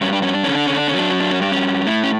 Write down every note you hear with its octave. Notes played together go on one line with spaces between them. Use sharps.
G2 C#4
D4
C#4
D4
D3 C#4
D4
C#4
D4
C#4
F#3 D4
C#4
D4
C#4
G2 D4
C#4
A2 E4
C#4